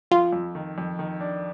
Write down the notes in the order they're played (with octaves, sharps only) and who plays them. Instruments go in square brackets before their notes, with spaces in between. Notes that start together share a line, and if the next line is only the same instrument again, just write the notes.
[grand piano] F2 [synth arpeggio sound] F4
[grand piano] F2
D#3
F2
D#3
D4